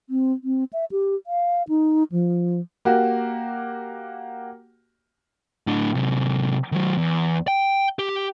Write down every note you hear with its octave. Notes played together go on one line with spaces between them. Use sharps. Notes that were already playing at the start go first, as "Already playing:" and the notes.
C4
C4
E5
G4
F5
D#4
F3
A#3 F#4 G4
A2 D4
C3 F#3
D#3 F#3
E2
G5
G4